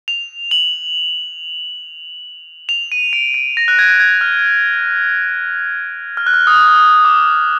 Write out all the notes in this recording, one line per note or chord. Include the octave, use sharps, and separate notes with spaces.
F7
F#7
F7
D#7
D7
D7
A#6
F#6
G#6
G#6
F6
F6
F#6
F6
D#6
F6
D#6
D6